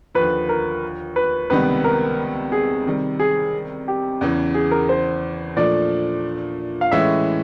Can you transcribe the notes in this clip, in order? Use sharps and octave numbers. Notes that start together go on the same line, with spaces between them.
D#2 D3 F3 B4
A#4
B4
C#2 C3 D#3 G3 B3 B4
A#4
G#4
C3 D#3 G3
G#4
G4
E2 C#3 E3
G#4
A#4
C5
A#2 F3 A3 D4 D5
F5
A2 E3 G#3 C#4 E4 E5